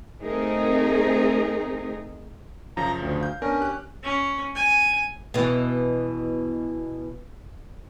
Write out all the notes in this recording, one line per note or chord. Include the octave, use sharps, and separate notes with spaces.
A3 C4 D#4 G#4 A#4
F#2 C#3 F3 A#5
D2
F5 G6
B3 C#4 D4 A#4
G4 F#6
C#4
G#5
B2 E3